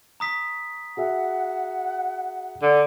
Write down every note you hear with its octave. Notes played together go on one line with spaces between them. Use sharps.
A#5 D#6 B6
F#4 G#4 E5 F#5
D3